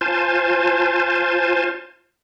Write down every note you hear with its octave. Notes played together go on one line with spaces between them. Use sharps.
F4 C5 G#5 A5